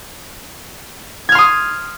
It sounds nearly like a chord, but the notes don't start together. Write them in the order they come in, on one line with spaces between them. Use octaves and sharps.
G#6 F6 C6 D#6